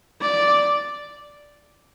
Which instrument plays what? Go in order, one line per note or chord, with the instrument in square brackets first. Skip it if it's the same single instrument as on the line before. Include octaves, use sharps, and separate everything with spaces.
[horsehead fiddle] D5